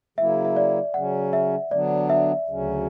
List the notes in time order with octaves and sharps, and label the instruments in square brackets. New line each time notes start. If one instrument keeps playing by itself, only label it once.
[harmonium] C#3 F#3 A#3 E4 [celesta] E5
[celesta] E5
D5
[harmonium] C#3 F#3 C#4 [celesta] F#5
[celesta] E5
[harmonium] D3 F#3 B3 D4 [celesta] D5
[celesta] E5
[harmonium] D2 C#3 F#3 C#4